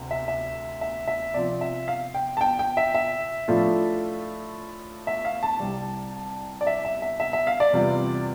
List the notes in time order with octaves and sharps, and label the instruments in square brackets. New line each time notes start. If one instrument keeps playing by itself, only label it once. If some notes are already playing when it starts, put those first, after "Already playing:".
Already playing: [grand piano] D2 C3
E5
E5
E5
E5
C3 F3 C4 D5
E5
F5
G5
A5
G5
G5
E5
E5
A2 F3 A3 D4 F4
E5
F5
A5
C2 C3 G3
D5
E5
E5
E5
E5
E5
F5
D5
E2 C3 G3 C4 F4